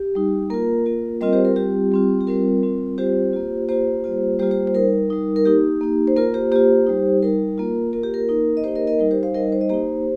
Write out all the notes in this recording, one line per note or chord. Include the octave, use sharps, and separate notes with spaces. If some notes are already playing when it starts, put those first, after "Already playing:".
Already playing: G4
G3 D#4
A#3 F4 A#4
A#3 F4
G3 C4 F4 A#4 D#5
G4 C5
A#4
G3 C4 F4 G4
G3 C4 F4
G4
G3 C4 F4 A#4
G3 C4 F4
G3 C4 F4 G4 C5
A#3 F4
A#3 F4 G4 C5
G3 A#3 F4
G3 A#3 F4 G4 C5
G4 C5
C5
G3 D#4 A#4
G3 D#4
A#4
A#3 D#4 G4
A#3 D#4
C5
A#3 F4 A#4
G4 C5
A#3 F4 G4 C5
G3 D#4
G3 D#4 A#4
A#3 F4
A#3 F4 A#4
G4
A#4
A#3 D#4
D#5
A#3 D#4 G4 C5
A#4 D#5
A#4 D#5
G3 D#4 A#4
G4 C5
C5 F5
G3 D#4 A#4 D#5
C5
D#5
A#3 D#4 G4 C5